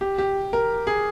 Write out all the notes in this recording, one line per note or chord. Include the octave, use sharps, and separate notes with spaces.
G4
G4
A#4
G#4